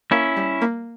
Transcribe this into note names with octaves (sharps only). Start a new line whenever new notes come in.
A#3 C#4 E4
G3
A#3